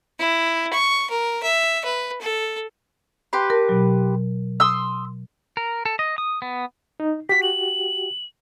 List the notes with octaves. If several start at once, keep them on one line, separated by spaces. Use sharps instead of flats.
E4
C#6
A#4
E5
B4
A4
G4 B4 C6
A#4 A5
B2 F#3
C6 D#6 E6
A#4
A4
D#5
D#6
B3
D#4
F#4 G4 B6
F#7